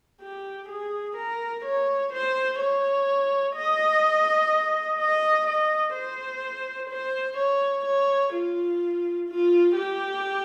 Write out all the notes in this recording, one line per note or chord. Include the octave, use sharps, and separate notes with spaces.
G4
G#4
A#4
C#5
C5
C#5
D#5
D#5
D#5
C5
C5
C#5
C#5
F4
F4
G4